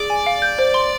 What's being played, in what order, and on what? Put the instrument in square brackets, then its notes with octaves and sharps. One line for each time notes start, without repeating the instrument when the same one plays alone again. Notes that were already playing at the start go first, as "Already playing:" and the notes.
Already playing: [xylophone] G#4 [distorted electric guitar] D5
[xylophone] G#5
F5
G6
C5
C6